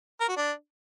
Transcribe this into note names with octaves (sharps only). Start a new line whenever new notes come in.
A#4
F#4
D4